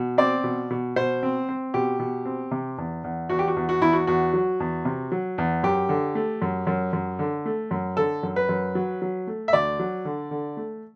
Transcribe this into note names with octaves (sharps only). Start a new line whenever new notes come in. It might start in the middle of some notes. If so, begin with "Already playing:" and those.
Already playing: B2
C4 D5
B2
B2
B2 C5
C4
C4
B2 G4
B2
C4
C3
E2
E2
E2 F#4
G4
F#4
E2
F#4
E2 E4
F#4
E2 F#4
F#3
E2
C3
F#3
E2
F#2 G4
D3
A3
F#2
F#2
F#2
D3
A3
F#2
D3 A4
F#2
B4
F#2
F#3
F#3
A3
E5
D2 D5
F#3
D3
D3
A3